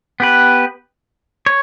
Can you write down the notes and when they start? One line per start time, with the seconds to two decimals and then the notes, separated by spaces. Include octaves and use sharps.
0.20 B3 G4 B4
1.46 C#5